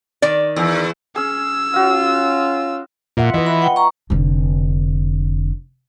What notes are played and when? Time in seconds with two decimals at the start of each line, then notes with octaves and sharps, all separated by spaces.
0.22 D#3 D5
0.56 E2
1.16 C#4 G#4 E6
1.74 C#4 F4 F#4 F5
3.17 A#2 F4 E5 F#5
3.34 E3 B4 D#5
3.46 B5
3.62 F#5 G5
3.76 A#5 C#6
4.10 F1 D3